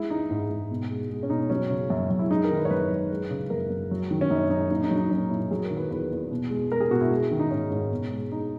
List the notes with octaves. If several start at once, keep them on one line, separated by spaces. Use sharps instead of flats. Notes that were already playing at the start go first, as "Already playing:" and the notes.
Already playing: G#3 E4
E3 D#4
G#2
G#2
B2
G#3
G#3
C#4
B2 D#4
F#3 C#4
C#3
F#2
F#2
E4
G#3 D#4
A#4
D#3
B4
C#5
F#2 B4
F#2
G#3
C#3
F#2 A#4
F#2
F#3
D#3
C#4
F#2 D#4
F#2 D#4
A#2 D#4
D#4
F#3
D#4
F#3 C#4
A#2 E4
F#3 G#4
A#4
D#3
B4
E2 B4
E2
B2
G#3
G#3 A#4
G#4
B2 F#4
E4
G#3
D#3
D#4
G#2 C#4
G#2
B2
G#3
G#3 D#4